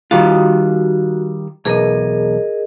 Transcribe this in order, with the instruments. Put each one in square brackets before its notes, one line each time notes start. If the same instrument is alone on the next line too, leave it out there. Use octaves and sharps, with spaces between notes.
[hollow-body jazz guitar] D#3 G3 F4 [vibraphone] F#4
[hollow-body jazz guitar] B1 E2 [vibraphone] G#4 A#4 D#5